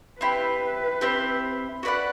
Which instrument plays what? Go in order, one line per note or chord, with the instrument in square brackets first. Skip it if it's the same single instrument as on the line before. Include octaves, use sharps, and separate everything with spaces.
[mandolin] C4 E4 G4 [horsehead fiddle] B4
[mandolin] C4 E4 G4
F#4 B4 D5 F#5